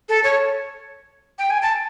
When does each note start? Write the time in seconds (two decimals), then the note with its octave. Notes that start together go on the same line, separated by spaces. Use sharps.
0.09 A4
0.24 C#5
1.39 G5
1.50 G#5
1.62 A5